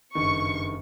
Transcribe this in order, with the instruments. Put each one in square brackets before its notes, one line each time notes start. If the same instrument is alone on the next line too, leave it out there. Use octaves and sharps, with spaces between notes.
[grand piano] F#1 G2 D#3 [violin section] C#6